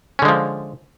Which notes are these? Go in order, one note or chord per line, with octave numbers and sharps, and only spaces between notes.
D3 F3 G#3 C#4